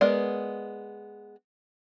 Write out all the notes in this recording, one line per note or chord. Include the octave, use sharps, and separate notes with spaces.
G#3 B3 A#4 D5